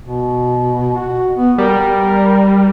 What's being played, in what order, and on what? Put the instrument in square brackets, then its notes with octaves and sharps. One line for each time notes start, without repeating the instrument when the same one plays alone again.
[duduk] B2
F#4
B3
[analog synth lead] G3 [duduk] A#4